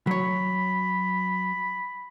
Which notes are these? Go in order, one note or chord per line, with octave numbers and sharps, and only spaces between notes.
F#3 C#5 B5